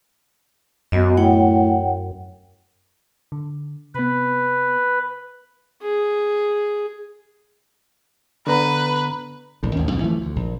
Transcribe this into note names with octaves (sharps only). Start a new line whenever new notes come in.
F#2 B3 F#4 D#5
A2 C#5 F#5 G5
D3
C3 B3 B4
G#4
D3 B3 B4 A#5
A#1 A2
A1 D#2 C#4
B1 F2 A2
E3 F3 A3
D2
A#1